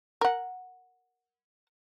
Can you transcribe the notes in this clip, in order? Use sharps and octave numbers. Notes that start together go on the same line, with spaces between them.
A#4 F#5